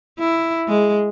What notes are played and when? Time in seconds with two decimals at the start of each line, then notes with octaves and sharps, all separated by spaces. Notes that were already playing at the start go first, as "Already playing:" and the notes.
0.19 E4
0.68 G#3